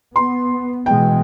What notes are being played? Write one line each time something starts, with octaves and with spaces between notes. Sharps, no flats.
B3 C6
B2 E3 G#3 G5